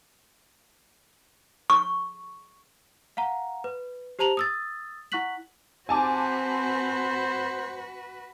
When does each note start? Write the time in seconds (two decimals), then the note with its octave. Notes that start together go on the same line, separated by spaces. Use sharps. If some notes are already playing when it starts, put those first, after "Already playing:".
1.70 C#6
3.17 F5 F#5 A#5
3.64 B4
4.19 G4 C5 A5 A#5 F7 F#7
4.37 D#6 E6 A6
5.12 E4 F#5 C#6 F#6 B6 F#7
5.89 C4 F#4 B4 C5 G#5 A5 D6